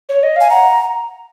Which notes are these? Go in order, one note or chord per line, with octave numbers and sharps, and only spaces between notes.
C#5
D#5
F5 G#5
F#5 A#5